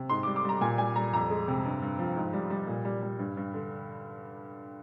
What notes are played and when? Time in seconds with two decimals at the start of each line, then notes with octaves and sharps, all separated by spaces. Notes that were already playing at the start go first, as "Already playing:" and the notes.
Already playing: C3
0.09 G#2 C6
0.23 D6
0.27 G3
0.36 D6
0.45 G3 A#5
0.61 A#2 G#5
0.78 G3 G#5
0.96 G3 A#5
1.13 F2 A#5
1.30 G#3
1.48 C3
1.65 G2
1.82 G2
1.99 F3
2.16 G#2
2.33 G3
2.50 G3
2.67 A#2
2.85 G3
3.02 G3
3.19 G2
3.37 G2
3.54 D3